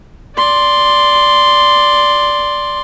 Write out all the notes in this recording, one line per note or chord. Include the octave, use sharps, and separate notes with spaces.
D5 C6